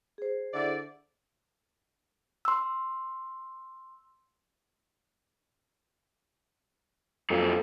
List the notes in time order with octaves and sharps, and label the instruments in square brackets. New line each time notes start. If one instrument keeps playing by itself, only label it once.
[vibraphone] G#4 C5
[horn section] D3 E4 D5
[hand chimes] C6 E6
[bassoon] F2 [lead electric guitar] A#2 F#3